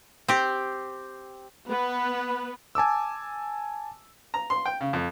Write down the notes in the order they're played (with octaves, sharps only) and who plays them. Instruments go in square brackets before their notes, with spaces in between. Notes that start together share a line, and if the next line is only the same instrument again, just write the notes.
[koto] C4 G4
[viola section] B3 B4
[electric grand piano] G#5 A5 D6 E6
[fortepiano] A#5
C6
G5
C#3
F2